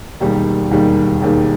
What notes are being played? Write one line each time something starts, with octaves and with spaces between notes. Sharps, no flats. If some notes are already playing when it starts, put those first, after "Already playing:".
E1 D#2 D#3 G3
E1 D#2 D#3 G3
E1 D#2 D#3 G3